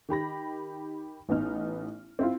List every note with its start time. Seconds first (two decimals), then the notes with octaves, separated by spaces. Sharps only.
0.09 D#3 G4 B5 A#6
1.29 A1 B3 D#4 F6
2.19 C4 E4 F4